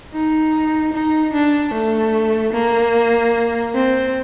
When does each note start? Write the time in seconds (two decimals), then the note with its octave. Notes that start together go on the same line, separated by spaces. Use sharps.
0.13 D#4
0.93 D#4
1.33 D4
1.74 A3
2.54 A#3
3.75 C4